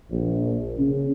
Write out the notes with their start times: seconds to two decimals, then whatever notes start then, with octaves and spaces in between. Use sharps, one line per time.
0.11 A#1
0.78 C#3